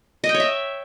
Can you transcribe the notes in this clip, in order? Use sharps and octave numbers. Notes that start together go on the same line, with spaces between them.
D#5
G5
C#5
E5